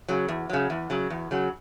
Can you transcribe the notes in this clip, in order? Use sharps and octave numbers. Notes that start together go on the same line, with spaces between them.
C#3 F#3
E2
C#3 F#3
E2
C#3 F#3
E2
C#3 F#3